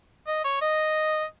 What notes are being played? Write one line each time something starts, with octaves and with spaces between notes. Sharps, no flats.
D#5
C#5
D#5